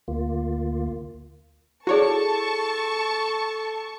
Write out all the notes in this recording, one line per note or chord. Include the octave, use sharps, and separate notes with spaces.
D2 A#3 F4
E4 F#4 G#4 A4 C#5 D5 A5 C#6